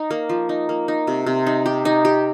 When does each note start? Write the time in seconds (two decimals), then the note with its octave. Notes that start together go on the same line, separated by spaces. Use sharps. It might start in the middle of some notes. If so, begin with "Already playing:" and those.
Already playing: D#4
0.11 A#3
0.29 F3
0.49 D#4
0.69 A#3
0.88 D#4
1.07 C3
1.26 C3
1.47 D#4
1.66 G4
1.85 D#4
2.05 G4